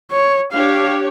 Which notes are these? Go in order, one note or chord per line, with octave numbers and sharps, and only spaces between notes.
C#5
D4 G4 C#5 F5